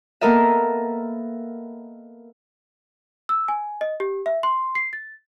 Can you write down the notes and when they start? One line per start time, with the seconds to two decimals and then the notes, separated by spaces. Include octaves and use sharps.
0.21 A#3 B3 A4 A#4 D#5 E5
3.29 E6
3.48 G#5
3.81 D#5
4.00 G4
4.26 E5
4.43 C6
4.75 C7
4.93 A6